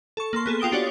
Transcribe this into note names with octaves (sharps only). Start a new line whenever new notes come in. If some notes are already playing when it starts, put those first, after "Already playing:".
A4 C#6
A#3 C6
B3 G#4 A4
F4 G5 D#6 D7 G7
D4 F#4 G4 C#5 D5